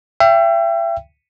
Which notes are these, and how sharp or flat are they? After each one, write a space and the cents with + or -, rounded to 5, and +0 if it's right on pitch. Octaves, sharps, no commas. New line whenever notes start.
E5 +35 G5 +0